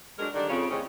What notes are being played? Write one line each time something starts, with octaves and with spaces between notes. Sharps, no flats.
F#3 G#3 D4 A#4
D3 D#3 G3 D4
F2 C#3
E2 A2 C#3 C4 C#4 D#5